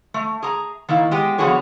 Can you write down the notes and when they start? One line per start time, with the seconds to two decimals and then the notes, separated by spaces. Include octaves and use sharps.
0.14 A3
0.42 G#4 A#5
0.89 D#3 A#3 E4
1.11 G#3 B3 G4 D#5
1.38 D3 F3 B3 F#4 G#4 C#5